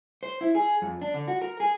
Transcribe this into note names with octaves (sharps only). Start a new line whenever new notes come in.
C5
E4
G#4
F2
D4
D3
F#4
A#4
G#4